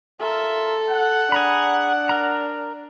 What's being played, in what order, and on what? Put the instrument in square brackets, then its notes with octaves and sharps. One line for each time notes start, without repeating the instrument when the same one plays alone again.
[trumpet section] F4 A#4 E5 [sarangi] A4
[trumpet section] F#5
[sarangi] D4 [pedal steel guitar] G#4 A#5 B5
[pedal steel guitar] A#4 A#5